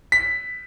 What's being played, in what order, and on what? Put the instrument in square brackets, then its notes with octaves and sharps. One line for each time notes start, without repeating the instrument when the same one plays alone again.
[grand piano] B6